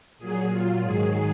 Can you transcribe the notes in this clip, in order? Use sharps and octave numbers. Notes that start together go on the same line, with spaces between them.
A#2 F#3 G#4
A#2 F#3 F4
G#2 D#3 F#3 G#4